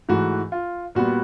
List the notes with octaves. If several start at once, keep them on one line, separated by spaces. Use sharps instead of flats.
G#2 E3 A3 F#4
F4
A#2 G3 B3 F#4